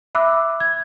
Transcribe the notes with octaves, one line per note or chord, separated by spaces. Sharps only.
E5 B5 D6 E6 F#6
G#6